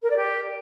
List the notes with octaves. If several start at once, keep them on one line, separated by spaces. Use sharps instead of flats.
A#4
D5
G4